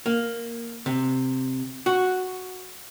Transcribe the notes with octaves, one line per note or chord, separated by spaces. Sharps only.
A#3
C3
F#4